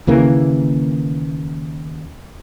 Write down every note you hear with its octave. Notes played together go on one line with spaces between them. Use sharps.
D#2 C#3 E3 A#3